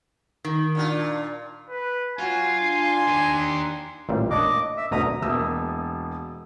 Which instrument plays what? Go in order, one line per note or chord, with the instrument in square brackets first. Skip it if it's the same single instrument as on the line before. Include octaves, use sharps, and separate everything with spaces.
[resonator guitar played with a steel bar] D#3
[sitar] A#2 D4 F4
[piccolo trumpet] B4
[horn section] F#3 F#4 [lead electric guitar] F4 [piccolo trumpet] G#5
[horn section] D4 C6
[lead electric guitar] D#3 G4
[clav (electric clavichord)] A1 A#2 G3
[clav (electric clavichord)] A#3 D4 C#5 [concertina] D#5 D6
[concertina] E5
[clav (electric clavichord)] D2 B2 [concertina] A#5 D#6
[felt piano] E1 B2 A#3 E5 D#6 E6